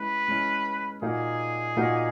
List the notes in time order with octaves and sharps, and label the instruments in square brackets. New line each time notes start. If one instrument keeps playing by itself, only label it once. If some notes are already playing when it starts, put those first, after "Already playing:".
Already playing: [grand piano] G#3 C#4 E4 [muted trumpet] B4
[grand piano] G#3 C#4 E4
[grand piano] A#2 A#3 D#4 F#4 [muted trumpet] G#4
[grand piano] A#2 A#3 D#4 F#4